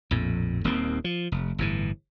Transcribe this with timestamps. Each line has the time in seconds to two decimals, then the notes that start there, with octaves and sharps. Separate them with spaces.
0.11 A#1 F2 A2
0.64 D#1 D#2 A#3 C4
1.04 F3
1.32 F1
1.58 G1 A2 E3